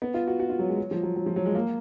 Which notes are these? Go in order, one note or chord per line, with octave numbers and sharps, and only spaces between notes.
B3
F4
F#4
F#4
F4
F#3
G#3
F#3
F3
F#3
F#3
F3
F#3
G#3
A#3